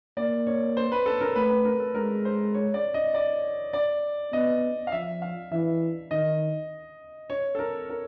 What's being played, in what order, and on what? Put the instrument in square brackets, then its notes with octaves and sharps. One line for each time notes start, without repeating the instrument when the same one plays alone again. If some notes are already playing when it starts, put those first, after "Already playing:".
[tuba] A#3 [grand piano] D5
[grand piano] C#5
C5
B4
A4
A#4
[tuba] A3 [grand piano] B4
[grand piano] B4
A#4
A4
[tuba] G#3 [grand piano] A#4
[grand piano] C5
C#5
D5
D#5
D5
D5
[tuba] B3 [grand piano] D#5
[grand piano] F5
[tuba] F3 [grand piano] E5
[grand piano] F5
[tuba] E3 [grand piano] E5
[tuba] D#3 [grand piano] D#5
[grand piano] C#5
A4
A#4
A#4